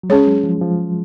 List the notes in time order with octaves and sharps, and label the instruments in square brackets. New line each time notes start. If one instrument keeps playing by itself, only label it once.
[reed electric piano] F#3
[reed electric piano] G#3 [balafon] C#4 G#4 C#5
[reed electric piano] F#3
F3
F3